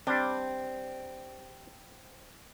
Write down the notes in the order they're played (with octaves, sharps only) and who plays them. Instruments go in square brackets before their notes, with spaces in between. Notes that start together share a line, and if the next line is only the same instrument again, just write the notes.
[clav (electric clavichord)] G3 D4 [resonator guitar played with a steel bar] C4